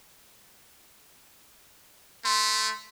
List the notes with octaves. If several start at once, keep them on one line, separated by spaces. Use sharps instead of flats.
A3 C6